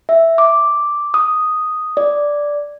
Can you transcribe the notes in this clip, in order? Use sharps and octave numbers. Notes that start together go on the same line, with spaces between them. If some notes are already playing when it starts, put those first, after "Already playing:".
E5
D6
D#6
D5